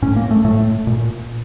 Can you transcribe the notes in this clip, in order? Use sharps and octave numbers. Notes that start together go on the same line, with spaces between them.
A2 C#4
A#3
A3
A2 A3
A#2